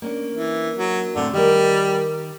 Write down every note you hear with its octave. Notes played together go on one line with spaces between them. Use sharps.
A#3 C#4 D4
E3
F#3
A2 D3 C4
D#3 G3 A#4